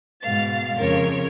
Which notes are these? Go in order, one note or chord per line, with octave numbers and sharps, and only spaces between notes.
G#2 B2 F5 A6
F2 C#3 A#4 C#5